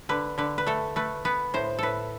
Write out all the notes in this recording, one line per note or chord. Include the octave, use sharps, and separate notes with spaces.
D3 B4
D3 B4
B4
A3 A4
A3 B4
B3 B4
A2 C5
A2 A4 B4